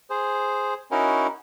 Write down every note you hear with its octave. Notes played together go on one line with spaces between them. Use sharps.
G#4 C5
C#4 D#4 E4 F#4 A#4